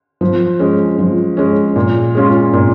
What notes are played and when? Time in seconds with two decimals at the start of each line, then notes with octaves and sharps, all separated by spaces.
0.21 F3
0.59 G#3 C#4
0.99 F3
1.37 G#3 C#4
1.76 A#2
2.15 G#3 C#4 F4
2.53 A#2